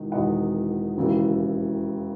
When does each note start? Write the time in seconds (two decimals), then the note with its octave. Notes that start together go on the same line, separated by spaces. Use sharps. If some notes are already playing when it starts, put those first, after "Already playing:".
Already playing: E1 E2 D#3
0.12 E1 E2 D#3 D#5 F#5
0.97 E1 D#2 C#3 E3